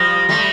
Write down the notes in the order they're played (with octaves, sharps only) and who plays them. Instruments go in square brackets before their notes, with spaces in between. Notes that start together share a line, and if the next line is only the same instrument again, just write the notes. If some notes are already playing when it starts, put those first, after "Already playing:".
Already playing: [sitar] F3 G3 [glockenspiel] A#6
[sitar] G3 A3